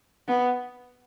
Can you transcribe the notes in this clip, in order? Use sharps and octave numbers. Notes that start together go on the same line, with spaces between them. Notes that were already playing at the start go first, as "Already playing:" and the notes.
B3